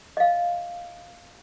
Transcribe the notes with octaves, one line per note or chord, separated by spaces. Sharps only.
D#5 F5